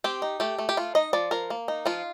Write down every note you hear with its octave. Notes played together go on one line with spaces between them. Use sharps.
C4 G4
D#4
A3 G4
A3
G4
A3 F4
D#4 D#5
F3 D5
F3 A#4
A#3
D#4
F3 F4